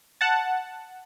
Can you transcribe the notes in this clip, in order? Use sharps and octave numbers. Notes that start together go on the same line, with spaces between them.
F#5 A5